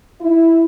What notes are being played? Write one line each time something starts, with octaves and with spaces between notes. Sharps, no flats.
E4